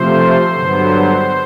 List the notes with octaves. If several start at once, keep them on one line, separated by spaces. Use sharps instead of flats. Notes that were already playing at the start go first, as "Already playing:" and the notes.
Already playing: C3 F3 A3 C5
G2 D3 F#3 B3